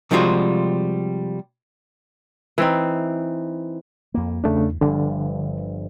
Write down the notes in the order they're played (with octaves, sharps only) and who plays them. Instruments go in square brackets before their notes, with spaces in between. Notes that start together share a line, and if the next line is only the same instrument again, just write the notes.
[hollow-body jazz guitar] C3 F3 G3 G#3 F4 F#4
[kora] E3 C4 D#4
[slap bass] F2 A#3
[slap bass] E2 [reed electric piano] C#3 A3 D4
[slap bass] G1 G2 F3 [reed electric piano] D3